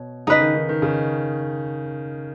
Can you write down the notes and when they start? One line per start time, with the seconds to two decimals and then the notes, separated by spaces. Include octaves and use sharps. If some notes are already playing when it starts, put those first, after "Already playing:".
Already playing: B2 C#5
0.27 C#3 D#4 B4 D#5
0.41 D#3
0.55 D#3
0.69 D#3
0.82 C#3